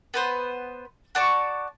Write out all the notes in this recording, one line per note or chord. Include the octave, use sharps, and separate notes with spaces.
B3 B4 C5
F#4 D5 A5 C#6